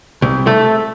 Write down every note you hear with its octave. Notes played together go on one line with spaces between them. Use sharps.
C2
A3